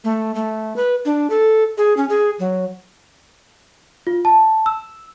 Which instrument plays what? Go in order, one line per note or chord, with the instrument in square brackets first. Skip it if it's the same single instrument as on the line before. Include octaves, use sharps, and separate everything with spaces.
[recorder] A3
A3
B4
D4
A4
G#4
C#4
G#4
F#3
[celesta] F4
A5
E6